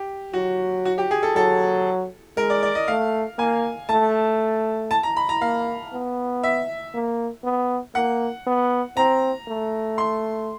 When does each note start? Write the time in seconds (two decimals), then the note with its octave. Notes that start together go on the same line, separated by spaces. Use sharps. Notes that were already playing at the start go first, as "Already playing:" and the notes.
Already playing: G4
0.33 F#3 F#4
0.85 F#4
0.98 G4
1.11 G#4
1.23 A4
1.36 F#3 A4
2.37 G#3 A#4
2.50 D5
2.63 D5
2.75 D#5
2.88 A3 F5
3.38 A#3 G#5
3.89 A3 A5
4.91 A5
5.03 A#5
5.17 B5
5.29 A#5
5.41 A#3 F5
5.93 B3
6.43 E5
6.94 A#3
7.44 B3
7.95 A#3 F#5
8.47 B3
8.97 C4 A#5
9.48 A3
9.98 C6